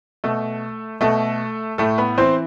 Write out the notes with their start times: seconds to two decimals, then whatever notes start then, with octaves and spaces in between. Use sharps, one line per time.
0.24 B2 A3 A4
1.01 B2 A3 A4
1.78 A2 A3 A4
1.98 B3 B4
2.17 E3 C4 C5